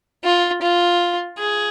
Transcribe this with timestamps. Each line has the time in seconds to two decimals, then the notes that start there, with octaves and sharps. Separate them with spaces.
0.24 F4
0.62 F4
1.38 G#4